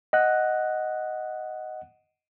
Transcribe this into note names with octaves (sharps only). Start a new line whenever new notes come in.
D#5 F#5 F#6